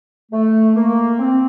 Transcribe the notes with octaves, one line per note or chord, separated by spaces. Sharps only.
A3
A#3
C4